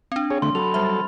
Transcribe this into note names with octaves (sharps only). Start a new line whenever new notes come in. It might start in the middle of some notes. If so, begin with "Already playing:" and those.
C4 D4
G#4 C#5
D3 A3 C6
F#3 A4 B5 F7
G3 E5 B5 F6
A6